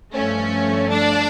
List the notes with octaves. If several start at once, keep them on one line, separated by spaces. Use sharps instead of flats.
G2 F3 A3 C#4
D4